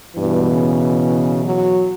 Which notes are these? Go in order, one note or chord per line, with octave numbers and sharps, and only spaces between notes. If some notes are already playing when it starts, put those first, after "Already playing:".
G2 B2 E3
C#3
F#3